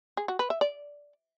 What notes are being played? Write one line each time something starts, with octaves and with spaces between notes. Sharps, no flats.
G#4
F#4
B4
E5
D5